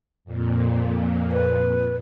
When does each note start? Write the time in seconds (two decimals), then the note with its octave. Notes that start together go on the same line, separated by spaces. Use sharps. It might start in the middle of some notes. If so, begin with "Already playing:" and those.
0.25 F2 A#2
1.32 B4